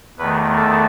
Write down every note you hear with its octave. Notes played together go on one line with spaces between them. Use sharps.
E2 D#3 A3 B4
A4